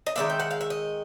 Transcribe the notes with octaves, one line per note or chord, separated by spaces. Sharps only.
D#5
D#3 G#3 B3 D4 E5
G5
F#5
F5
E5
D#5